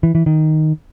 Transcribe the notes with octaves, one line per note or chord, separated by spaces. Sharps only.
E3
E3
D#3